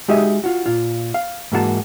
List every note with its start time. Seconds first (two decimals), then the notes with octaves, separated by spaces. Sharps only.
0.08 G#3 D#4 F#4 G4 D#5 E5
0.44 F4 F#4
0.66 A#2 F4
1.14 F5
1.52 G#2 E3 A#3 F#4 B4 A5